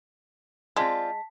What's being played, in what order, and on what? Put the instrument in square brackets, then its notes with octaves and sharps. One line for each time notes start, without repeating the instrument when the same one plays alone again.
[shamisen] G#3 [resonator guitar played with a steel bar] C4 F4 D5 [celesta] A5 B6